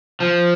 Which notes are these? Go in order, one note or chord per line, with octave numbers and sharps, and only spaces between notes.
F3